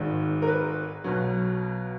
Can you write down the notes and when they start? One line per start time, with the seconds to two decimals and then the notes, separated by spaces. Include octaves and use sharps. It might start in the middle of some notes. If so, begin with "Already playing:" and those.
Already playing: G#1 G#2 D#3
0.42 A#4
0.47 B4
1.04 B1 B2 F#3